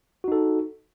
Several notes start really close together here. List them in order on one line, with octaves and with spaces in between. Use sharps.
F#4 D#4 A4